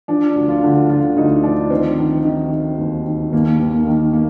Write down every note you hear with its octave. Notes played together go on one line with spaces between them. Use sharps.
F3 D4
D2
F4
D3
D3 F4
D2 D#4
F3 D4
D#3 C4
D#3
D#3
D#3
D#2
D#3
D#2 A#3
D#2
A#3
D#3
A#3